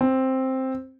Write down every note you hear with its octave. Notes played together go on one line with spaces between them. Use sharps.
C4